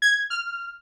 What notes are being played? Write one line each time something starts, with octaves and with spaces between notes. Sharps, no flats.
G#6
F6